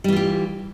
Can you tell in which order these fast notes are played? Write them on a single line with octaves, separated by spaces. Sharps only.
G3 E3 F4 G4